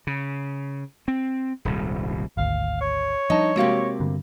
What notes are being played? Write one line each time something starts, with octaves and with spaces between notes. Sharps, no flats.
C#3
C4
D#1 C2 G#2
G#1 D2 F5
C#5
F3 G3 D4 D#4 D#5 A5
C3 G#3 A#3 F#4 G4 F5
G2 D3